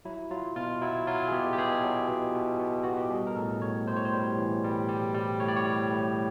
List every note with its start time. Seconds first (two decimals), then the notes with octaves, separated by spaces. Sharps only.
0.05 F#3 E4
0.31 F#3 F4
0.56 B2 F4
0.82 F#3 E4
1.07 F#3 F4
1.28 G#4
1.32 B2 G4
1.53 G4
1.58 B2 G#4
1.84 F#3
2.09 B2
2.34 B2
2.60 B2
2.83 B2 F#4
2.97 G4
3.11 G3 G#4
3.27 A#4
3.36 A2 A4
3.62 A2 C#5
3.87 A2 C5
3.96 C#5
4.05 C5
4.13 G3
4.38 E3
4.64 G3
4.89 G3
5.15 G3
5.40 A2 C#5
5.48 D5
5.57 C#5
5.65 G3
5.91 A2